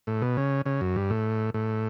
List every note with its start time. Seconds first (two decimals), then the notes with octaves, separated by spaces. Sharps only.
0.07 A2
0.22 B2
0.37 C#3
0.66 C#3
0.81 F#2
0.96 G2
1.10 A2
1.54 A2